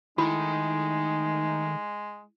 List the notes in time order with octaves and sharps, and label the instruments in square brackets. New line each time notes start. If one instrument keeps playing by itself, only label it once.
[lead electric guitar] D#3 [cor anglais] G#3 [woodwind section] A3 D#4 [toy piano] E4 B5